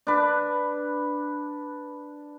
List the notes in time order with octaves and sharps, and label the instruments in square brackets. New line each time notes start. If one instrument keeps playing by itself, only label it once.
[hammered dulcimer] D4 B4